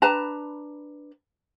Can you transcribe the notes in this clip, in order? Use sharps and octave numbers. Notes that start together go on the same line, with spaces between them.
D4 B4 A5 A#5